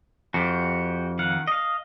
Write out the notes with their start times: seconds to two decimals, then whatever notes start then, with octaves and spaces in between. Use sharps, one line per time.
0.34 F2 F#4 G4
1.19 D#3 F5 F#5
1.47 D#5 F5